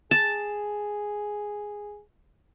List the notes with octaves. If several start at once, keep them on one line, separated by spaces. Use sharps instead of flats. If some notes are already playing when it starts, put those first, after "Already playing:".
G#4 A5